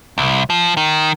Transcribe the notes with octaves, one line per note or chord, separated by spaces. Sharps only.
C2
F3
D#3